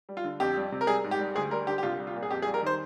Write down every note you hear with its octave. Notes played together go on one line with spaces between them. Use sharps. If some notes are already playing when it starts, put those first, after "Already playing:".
G3
F4
D3
F2 G4
G3
C3
A#4
G3 G#4
G#2
G4
G3
D2 G#4
G3 A#4
D3 G4
G4
C2 F4
G3
F4
A#2
G#4
F2 G4
G#4
G3
A#4
D#3 C5